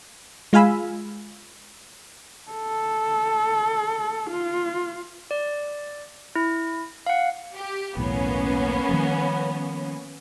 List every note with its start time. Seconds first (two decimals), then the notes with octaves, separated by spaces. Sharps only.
0.53 G#3 F4 F5 G#5 B5 E6
2.51 A4
4.30 F4
5.31 D5
6.35 E4
7.06 F5 F#5
7.55 G4
7.97 B1 E2 A2 A#3 B3 C#4
8.89 D#3 F3 G3